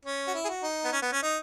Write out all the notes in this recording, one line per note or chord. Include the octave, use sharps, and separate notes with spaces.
C#4
F#4
E4
G#4
F#4
D#4
B3
C#4
B3
C#4
D#4